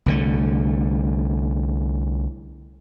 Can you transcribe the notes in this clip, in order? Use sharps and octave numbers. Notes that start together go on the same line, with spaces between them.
C2 D3 A3